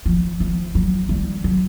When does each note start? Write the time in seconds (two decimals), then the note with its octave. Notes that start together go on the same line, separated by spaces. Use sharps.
0.06 F3
0.40 F3
0.75 F#3
1.09 G3
1.44 F#3